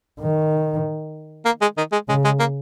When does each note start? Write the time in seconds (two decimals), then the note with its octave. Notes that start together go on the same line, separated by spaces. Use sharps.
0.20 D#3
1.45 A#3
1.61 G#3
1.78 D#3
1.92 G#3
2.08 C#3 G#3
2.25 G#3
2.39 A#3